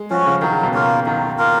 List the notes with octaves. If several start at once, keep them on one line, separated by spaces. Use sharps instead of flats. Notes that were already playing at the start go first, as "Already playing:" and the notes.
Already playing: G#3
F3 C#4 F#4
C#3
D#3 F#3
C#3
B2
C#3 A#3 F4 A#4
D#3 F#3
A#3 F4 A#4